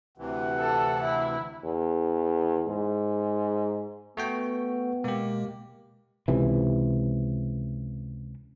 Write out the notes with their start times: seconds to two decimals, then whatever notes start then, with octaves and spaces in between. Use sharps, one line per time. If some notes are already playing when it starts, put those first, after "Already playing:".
0.18 D2 C3 E3 F#5
0.59 A4
1.04 E4
1.65 E2
2.68 G#2
4.17 A3 B3 F#4 G5
5.04 B2 G#3 A#3 G4
6.28 C#2 C3 E3